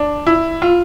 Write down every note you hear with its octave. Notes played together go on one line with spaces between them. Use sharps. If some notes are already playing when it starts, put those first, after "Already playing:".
Already playing: D4
E4
F4